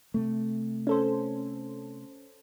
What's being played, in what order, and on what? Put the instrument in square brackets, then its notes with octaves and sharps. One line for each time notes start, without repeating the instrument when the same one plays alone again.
[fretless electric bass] C3 A3
[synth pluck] C#4 A4 C5